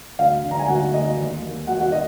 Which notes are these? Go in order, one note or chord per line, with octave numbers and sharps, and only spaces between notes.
D2 F5
D3
A#5
G#5
D2 F#4 F#5
D2 D#5
D#2
D#2
D#2 F#4 F#5
F#4 F#5
D#5